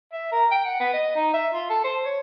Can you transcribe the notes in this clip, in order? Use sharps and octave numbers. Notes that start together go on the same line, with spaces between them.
E5
A#4
G5
F#5
B3
D#5
D#4
E5
F4
A4
C5
C#5